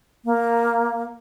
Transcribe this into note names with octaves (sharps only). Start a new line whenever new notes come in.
A#3